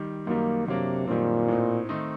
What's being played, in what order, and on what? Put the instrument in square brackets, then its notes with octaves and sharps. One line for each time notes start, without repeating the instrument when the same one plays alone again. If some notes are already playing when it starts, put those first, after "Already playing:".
Already playing: [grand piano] D#3 G3
[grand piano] F#2 D#3 G3 [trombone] A#3
[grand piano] F#2 F#3 A#3 D4 [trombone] C3
[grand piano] F#2 D#3 G3 C4 [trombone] A#2
[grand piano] A2 A3 C4 D#4
D#3 A3 C4 D#4